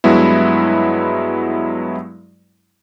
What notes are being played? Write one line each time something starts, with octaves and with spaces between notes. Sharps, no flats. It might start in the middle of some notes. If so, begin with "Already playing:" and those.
G2 F#3 G#3 B3 E4